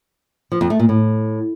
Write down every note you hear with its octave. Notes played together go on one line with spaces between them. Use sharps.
F3
F2
A3
A#2
A2